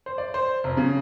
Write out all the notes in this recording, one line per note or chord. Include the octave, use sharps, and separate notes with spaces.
C5
D5
C5
F1
C#3